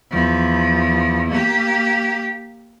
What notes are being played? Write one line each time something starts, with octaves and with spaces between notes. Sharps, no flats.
E2 F3
A#3 G4